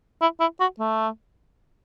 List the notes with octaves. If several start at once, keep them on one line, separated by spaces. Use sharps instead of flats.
E4
E4
F#4
A3